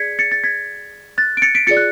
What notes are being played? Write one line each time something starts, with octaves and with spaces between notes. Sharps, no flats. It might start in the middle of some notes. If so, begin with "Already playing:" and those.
Already playing: G#4 D5 G#6 B6 C#7
A6 C#7
A6
G#6 B6
F#6 A6
D7
A6 C#7
B6 D7
F4 G#4 D5 A6 C#7
F#6